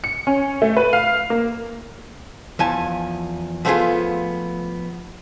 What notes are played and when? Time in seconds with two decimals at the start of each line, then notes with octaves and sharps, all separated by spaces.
0.04 C#7
0.27 C#4
0.62 A3
0.77 B4
0.93 F5
1.30 A#3
2.59 E2 F3 G#5 A5
3.65 F3 A3 B3 C#4 F4 G#4